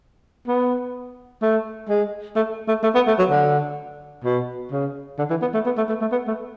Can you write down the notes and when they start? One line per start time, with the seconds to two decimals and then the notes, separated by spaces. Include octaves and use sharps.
0.48 B3
1.42 A3
1.89 G#3
2.36 A3
2.68 A3
2.83 A3
2.95 B3
3.07 A3
3.18 F#3
3.30 D3
4.24 B2
4.72 C#3
5.18 D3
5.30 E3
5.42 B3
5.54 A3
5.66 B3
5.77 A3
5.89 A3
6.01 A3
6.12 B3
6.28 A3